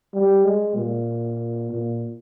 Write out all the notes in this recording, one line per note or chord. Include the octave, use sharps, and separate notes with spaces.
G3
G#3
A#2
A#2